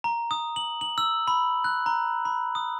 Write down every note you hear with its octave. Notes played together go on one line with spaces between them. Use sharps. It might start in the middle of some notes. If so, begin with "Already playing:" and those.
A#5
D#6
F#7
F#7
E6
B5
F#6
A#5
B5
D#6